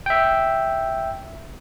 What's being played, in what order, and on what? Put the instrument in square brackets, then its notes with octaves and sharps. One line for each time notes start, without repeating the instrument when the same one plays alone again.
[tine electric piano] E5 G5